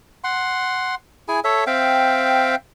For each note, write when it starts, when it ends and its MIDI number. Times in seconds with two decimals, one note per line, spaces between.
0.24 0.95 78
0.24 0.95 84
1.28 1.40 64
1.28 1.40 68
1.28 1.40 80
1.44 1.64 69
1.44 1.64 73
1.44 1.64 76
1.67 2.55 60
1.67 2.55 76
1.67 2.55 77
1.67 2.55 79